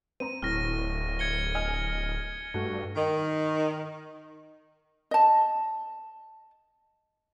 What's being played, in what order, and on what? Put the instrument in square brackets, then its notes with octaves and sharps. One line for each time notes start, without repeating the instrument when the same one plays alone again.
[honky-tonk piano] C4 A#5 [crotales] D#7
[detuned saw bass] D1 [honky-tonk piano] A2 [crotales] F6 A#6
[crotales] G#6 C#7 G7
[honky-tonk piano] D#5 G#5 F6
[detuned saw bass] G2 [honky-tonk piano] A3 F#4
[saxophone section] D#3
[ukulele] D#5 A5